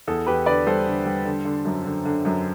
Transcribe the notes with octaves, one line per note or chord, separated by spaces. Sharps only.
E2 A4
E2 G4 B4
D3 B4 D5
G3 A4 C5
D3
G3
D3
D3
F#2
D3
D3
F#2